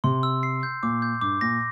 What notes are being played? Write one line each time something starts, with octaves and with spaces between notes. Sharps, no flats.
C3 C6
E6
C7
G6
A#2 D6
G6
G2 D6
A#2 A#6